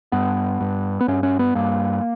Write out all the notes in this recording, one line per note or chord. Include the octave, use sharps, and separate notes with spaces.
G2 B3
G2
B3
G2 C#4
C#4
B3
G2 A#3